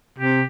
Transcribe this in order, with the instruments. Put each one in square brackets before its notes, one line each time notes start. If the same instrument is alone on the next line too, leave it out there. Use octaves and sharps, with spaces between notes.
[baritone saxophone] C3 [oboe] G4